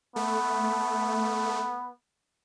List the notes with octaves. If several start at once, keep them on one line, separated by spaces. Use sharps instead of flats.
A3 B3